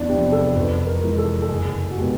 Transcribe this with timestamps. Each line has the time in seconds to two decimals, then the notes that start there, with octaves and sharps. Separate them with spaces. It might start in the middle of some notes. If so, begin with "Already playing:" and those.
Already playing: E2 B3 D4
0.09 C3 F3 G4
0.32 A4
0.55 F2 B4
0.87 A#4
1.02 C3 E3 G#3
1.18 A4
1.42 A4
1.49 F#1 G#4
1.90 F#4
1.96 B2 G#3 B3 G4